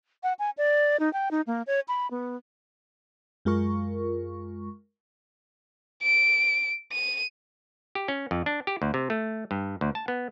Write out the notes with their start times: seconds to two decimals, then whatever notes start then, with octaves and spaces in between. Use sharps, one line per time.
0.23 F#5
0.39 G#5
0.58 D5
1.00 D#4
1.13 G5
1.31 D#4
1.47 A#3
1.67 C#5
1.88 B5
2.11 B3
3.45 F#2 G#3 F4 A#4 C#6
6.03 D7
6.92 D#7
7.95 G4
8.08 C#4
8.31 F2
8.46 D4
8.67 G4
8.82 D2
8.94 C3
9.10 A3
9.51 G2
9.81 D2
9.95 A5
10.08 B3